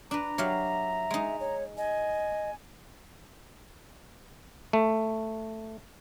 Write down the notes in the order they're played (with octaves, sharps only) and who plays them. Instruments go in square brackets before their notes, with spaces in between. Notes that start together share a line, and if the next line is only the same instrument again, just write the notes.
[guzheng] D4 B4 [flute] A#5
[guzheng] F#3 G4 F5 [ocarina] E5
[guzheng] G#3 D#4
[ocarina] C#5
[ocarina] D#5 [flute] G#5
[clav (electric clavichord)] A3